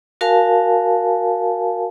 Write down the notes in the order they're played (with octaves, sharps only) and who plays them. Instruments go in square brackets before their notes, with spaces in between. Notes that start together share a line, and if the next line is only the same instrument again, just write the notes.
[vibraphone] F#4 A#4 F5 G#5 A5